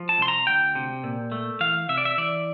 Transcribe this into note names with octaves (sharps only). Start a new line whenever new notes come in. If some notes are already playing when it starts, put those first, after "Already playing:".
Already playing: F3
A5
C2 C6
A#5
D2 G5
C3
A#2
A3
E3 F5
C3 E5
D5
E5
E3 D5